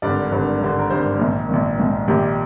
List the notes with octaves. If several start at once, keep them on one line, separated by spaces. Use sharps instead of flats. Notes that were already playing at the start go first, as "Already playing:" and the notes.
G#1 G2 D3 D5
G#1 G2 D3
G#1 G2 D3
A#4
G#1 G2 D3 C5
A#1 G#2 D#3
A#1 G#2 D#3
A#1 G#2 D#3
A#1 G#2 D#3 G4